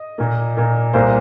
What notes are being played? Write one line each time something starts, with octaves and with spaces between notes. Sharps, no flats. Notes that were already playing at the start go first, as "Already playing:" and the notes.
Already playing: D#5
A#2 A#3
A#2 A#3
C2 A#2 A#3 C5 F5